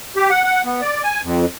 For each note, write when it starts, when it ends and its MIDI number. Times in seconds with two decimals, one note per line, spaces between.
0.16 0.30 67
0.30 0.42 78
0.43 0.62 78
0.65 0.81 59
0.81 1.03 74
1.04 1.21 80
1.23 1.45 41